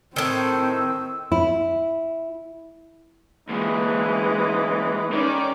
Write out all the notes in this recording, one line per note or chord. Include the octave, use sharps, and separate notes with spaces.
A2 D#3 C4 E6
E4
D2 A#2 E3 G#3
D#3 C#4 D5